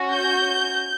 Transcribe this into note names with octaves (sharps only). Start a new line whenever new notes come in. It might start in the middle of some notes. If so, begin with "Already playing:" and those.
Already playing: C#4 F#4
G6